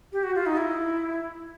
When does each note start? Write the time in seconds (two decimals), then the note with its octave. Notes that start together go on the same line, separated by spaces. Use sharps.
0.12 G4
0.24 F#4
0.35 F4
0.46 D#4
0.57 E4